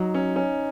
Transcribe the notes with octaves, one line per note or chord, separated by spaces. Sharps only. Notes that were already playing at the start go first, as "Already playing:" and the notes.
Already playing: F#3 D#4
C#4
C#4